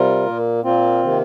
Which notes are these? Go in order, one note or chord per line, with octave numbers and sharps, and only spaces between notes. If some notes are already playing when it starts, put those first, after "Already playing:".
Already playing: C3 G3 F4 A#4
A#2 A#3
A#2 A#3 C4 F4
C3 D#3 A#3